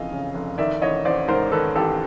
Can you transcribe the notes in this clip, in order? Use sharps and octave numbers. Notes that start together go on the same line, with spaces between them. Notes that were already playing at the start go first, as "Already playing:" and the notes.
Already playing: F1 F2 C#3 E3 D#5 F5
C#3
F1
D#3 D5 E5
A1 C#5 D#5
A1 C5 D5
G#2 A#4 C5
D#3 A4 B4
A1 G4 A4